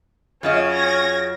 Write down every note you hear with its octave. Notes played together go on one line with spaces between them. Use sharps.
F#2 C#3 C#4 F4 D#5
G#6 A#6